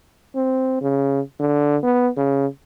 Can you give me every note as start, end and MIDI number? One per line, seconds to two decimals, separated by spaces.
0.35 0.79 60
0.81 1.20 49
1.40 1.77 50
1.83 2.08 59
2.17 2.46 49